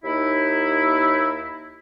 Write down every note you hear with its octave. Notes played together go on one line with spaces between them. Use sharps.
D#2 D#4 E4